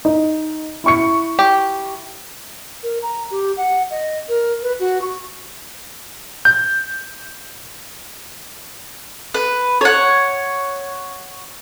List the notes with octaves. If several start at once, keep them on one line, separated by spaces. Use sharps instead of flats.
D#4
E4 C#6 C#7
G4
A#4
A#5
G4
F#5
D#5
A#4
B4
F#4
C#6
G6
B4
C#5 F#5